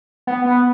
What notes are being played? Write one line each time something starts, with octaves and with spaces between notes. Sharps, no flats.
B3
B3